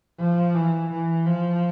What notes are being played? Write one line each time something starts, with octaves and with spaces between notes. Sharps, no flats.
F3
E3
E3
F3